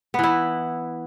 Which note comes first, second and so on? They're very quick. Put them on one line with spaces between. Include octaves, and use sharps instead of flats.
B3 E3 E4